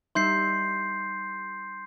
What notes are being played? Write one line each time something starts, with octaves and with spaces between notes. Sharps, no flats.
G3 D#4 E5 C6 G6 C7